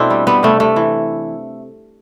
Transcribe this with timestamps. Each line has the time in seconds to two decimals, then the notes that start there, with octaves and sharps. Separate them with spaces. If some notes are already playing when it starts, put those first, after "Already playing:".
Already playing: B2 A3 C4 D4 E4
0.10 G3
0.27 G3 B3
0.43 C3 A3
0.60 C3 A3
0.76 E3